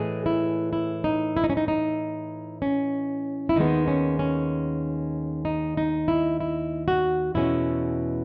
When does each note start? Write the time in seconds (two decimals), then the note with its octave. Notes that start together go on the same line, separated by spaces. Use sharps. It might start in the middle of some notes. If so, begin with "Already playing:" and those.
Already playing: A2 E3 G#3 G#4
0.26 E4
0.73 E4
1.04 D#4
1.37 E4
1.44 D#4
1.50 C#4
1.57 D#4
1.68 D#4
2.62 C#4
3.49 E4
3.56 D#2 D#3 G#3 B3 D#4
3.88 C#4
4.19 C#4
5.45 D#4
5.77 D#4
6.08 E4
6.40 E4
6.88 F#4
7.34 E2 B2 G#3 C#4 E4